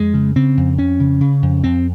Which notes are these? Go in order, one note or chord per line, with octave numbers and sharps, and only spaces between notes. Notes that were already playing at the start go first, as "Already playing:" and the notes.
Already playing: F2 G#3
C#3
C#3 C4
F2
F2 C#4
C#3
C#3
F2
F2 C4